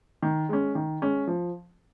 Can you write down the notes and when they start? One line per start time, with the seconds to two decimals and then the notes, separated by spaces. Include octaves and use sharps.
0.22 D#3
0.49 G#3 C#4
0.75 D#3
1.02 G#3 C#4
1.27 F3